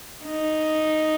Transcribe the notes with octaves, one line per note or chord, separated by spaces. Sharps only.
D#4